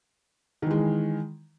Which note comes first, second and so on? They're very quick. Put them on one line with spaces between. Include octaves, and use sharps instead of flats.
D#3 E3 G#3